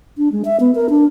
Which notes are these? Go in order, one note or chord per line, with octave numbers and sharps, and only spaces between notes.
D4
G#3
E5
B3
A#4
D4